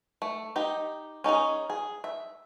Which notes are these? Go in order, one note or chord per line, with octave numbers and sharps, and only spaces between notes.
A3
D#4 G4
C#4 D#4 E4 G#4
G#4
E5